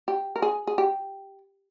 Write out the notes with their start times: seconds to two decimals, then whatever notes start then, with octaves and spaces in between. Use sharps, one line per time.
0.08 G4
0.36 A#4
0.42 G#4
0.67 G#4
0.78 G4